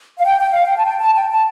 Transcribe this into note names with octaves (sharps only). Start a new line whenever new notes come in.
F5
G5
G5
F5
G5
A5
G5
A5
G5
A5